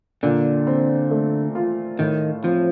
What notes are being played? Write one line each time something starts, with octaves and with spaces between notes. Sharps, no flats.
A#2 D3
C4
A3
F4
A2 D#3
F3 C4